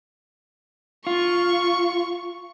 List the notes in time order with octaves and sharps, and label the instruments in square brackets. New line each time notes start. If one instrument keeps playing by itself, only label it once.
[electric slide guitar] F4 [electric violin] C#6